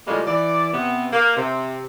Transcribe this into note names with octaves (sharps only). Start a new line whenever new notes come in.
A2 C#3 F3 G3 G#3 A#3
E3 D5
C3 B3
A#3
C3